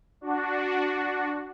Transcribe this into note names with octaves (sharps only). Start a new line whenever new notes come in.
D4 F#4